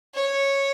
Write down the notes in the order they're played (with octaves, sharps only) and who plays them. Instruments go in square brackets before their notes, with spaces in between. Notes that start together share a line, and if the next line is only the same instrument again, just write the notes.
[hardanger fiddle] C#5